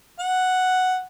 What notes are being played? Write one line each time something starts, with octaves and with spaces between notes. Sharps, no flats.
F#5